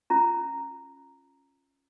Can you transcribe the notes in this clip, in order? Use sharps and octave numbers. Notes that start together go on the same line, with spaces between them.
C#4 F4 A#5